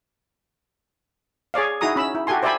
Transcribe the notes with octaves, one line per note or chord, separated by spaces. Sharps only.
G#4 C#5 D5 F5
D#4 E4 F#4 G#4 A#5 D#6
C#4 B5 E6
E4
F#4 G4 A4 G#5 C6
C5 D5 E5 G5 G#5 B5